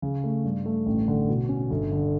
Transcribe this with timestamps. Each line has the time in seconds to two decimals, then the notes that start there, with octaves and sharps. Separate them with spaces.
0.02 C#3
0.24 A3
0.44 G2
0.65 A3
0.86 A1
1.08 D3
1.28 B2
1.49 C#4
1.70 G1
1.91 D3